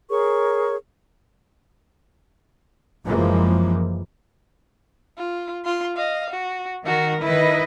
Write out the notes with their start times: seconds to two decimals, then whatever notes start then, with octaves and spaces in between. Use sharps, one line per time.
0.10 G#4 A#4 C#5 C#6
3.04 F#1 F#2 E3 F3 G#3 A#3
5.18 F4
5.65 F4 C6
5.97 D#5 F5
6.31 F#4
6.86 D#3 F#4 A#4
7.21 D#3 E4 B4 D#5